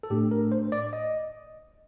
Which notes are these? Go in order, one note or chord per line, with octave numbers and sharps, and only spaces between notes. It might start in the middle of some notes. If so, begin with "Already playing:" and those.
A4
A2 A3 D4 G4
A#4
C5
D5
D#5